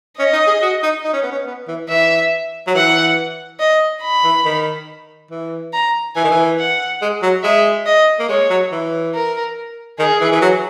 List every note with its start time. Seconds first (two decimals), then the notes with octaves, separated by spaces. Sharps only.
0.19 C#4 D#5
0.33 D#4
0.47 G#4
0.62 F#4
0.83 D#4
1.04 D#4
1.13 C#4
1.23 B3
1.32 C#4
1.47 B3
1.68 E3
1.89 E3 E5
2.67 F#3
2.75 E3 F#5
3.59 D#5
4.03 B5
4.24 E3
4.45 D#3
5.31 E3
5.73 A#5
6.15 E3 G#5
6.24 D#3
6.31 E3
6.59 F#5
7.02 G#3
7.22 F#3
7.43 G#3 E5
7.86 D#5
8.19 A#3
8.29 G#3 C#5
8.50 F#3
8.72 E3
9.14 A#4
9.99 D#3 G#4
10.21 E3
10.32 E3
10.41 F#3